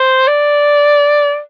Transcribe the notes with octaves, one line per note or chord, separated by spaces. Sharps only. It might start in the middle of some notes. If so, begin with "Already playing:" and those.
Already playing: C5
D5